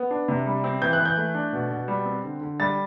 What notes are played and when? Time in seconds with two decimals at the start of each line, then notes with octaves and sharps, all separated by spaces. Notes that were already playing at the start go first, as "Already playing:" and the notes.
Already playing: B3
0.11 D4
0.28 C3
0.46 G3
0.64 C4
0.81 E3 G6
0.93 F#6
0.99 E3
1.05 G6
1.17 A3
1.35 D4
1.53 B2
1.70 B2
1.88 G3
2.06 C4
2.24 D3
2.41 D3
2.60 G3 A6